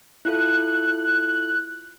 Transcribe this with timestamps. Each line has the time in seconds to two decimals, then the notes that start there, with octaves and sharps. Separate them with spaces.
0.25 E4 F4 A4 F#6